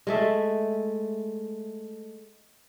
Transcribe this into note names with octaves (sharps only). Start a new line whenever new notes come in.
G#3 A3 E5